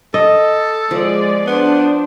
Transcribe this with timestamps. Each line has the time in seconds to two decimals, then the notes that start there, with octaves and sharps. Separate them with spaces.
0.14 A4 D#5
0.91 F3 G#3 G#4 D5
1.47 B3 D4 C5